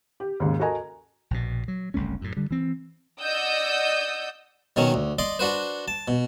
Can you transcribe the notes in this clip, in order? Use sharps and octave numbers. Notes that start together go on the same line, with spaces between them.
G4
D#2 G#2 C#3
F#4 A4 A#4 D#5 G#5 A#5
A#1 B2
F#3
F#1 C2 A3 C#4
F#2 A2
D3 G3
E3 C4
D5 D#5 F#5 D#6 E6 G6
B2 D#3 F#3 C#4
D2
D5 D#5 C6 D6
D4 F#4 B4 C5
A5
B2